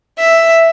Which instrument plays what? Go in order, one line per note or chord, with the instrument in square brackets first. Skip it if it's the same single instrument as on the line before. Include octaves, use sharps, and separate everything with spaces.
[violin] E5